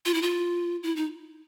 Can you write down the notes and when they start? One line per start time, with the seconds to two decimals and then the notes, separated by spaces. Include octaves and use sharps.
0.05 F4
0.14 E4
0.22 F4
0.83 E4
0.96 D#4